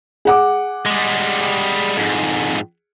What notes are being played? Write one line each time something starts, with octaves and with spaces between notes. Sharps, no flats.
G#4 F#5 D6
G3 G#3
F2 G#2